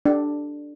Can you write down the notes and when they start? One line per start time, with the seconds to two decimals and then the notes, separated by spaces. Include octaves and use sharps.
0.06 D4